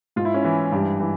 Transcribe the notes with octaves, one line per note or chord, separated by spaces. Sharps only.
G#2 F4
E4
C#4
E3 E4
G2 G4
E3